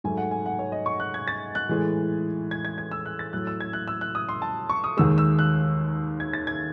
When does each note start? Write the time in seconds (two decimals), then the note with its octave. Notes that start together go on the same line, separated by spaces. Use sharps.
0.04 G#2 F#3 A3 G#5
0.18 F#5
0.31 G#5
0.46 F#5
0.59 C#5
0.72 D#5
0.86 C#6
1.00 F#6
1.14 G#6
1.28 A6
1.55 F#6
1.69 A2 E3 G#3
2.51 G#6
2.65 G#6
2.78 G#6
2.91 E6
3.06 F#6
3.19 A6
3.33 A2 F#3 A3 F#6
3.47 E6
3.60 G#6
3.73 F#6
3.88 E6
4.01 F#6
4.15 D#6
4.29 C6
4.42 A5
4.70 C#6
4.84 D#6
4.97 D#2 D#3 G#3 E6
5.18 E6
5.39 F#6
6.20 G#6
6.33 A6
6.47 G#6